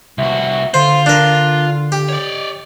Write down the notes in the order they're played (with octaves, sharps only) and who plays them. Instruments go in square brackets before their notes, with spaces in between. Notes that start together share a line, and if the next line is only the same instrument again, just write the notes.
[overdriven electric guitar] C2 F#4 [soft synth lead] E5
[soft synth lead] D3 [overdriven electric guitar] F4 [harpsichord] C5
[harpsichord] D4 A#4
G4
[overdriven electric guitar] C#5 D5